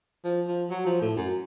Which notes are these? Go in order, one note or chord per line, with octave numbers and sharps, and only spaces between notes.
F3
F3
F#3
F3
A2
F#2